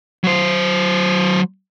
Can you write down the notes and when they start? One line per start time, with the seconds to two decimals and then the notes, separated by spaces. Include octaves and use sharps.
0.24 F#3 C5